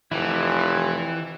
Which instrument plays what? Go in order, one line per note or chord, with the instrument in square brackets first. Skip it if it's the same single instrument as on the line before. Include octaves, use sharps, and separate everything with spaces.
[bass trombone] F1 [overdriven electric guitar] E3 [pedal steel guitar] E4 G4